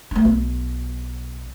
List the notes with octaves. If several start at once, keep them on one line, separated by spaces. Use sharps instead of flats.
A3 D4
B1